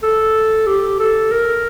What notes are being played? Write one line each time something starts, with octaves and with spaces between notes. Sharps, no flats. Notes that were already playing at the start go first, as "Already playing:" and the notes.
A4
G4
A4
A#4